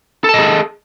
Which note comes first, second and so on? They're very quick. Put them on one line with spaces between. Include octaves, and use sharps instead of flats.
A4 A5 D#5 G#4